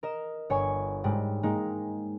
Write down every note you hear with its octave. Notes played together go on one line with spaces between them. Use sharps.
A#4 D#5 E7
G1 C#5 G#5 C#6
G#2 G3 G#3
G#3 A#3 D#4